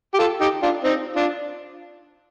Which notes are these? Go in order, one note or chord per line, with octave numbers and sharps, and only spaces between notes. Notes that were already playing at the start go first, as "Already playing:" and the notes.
G4
F4 A4
D#4 G4
D4 F4
C4 D#4
D4 F4